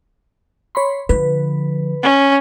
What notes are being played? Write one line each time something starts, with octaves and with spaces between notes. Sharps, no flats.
C#5 B5 C6
D3 F3 B4
C#4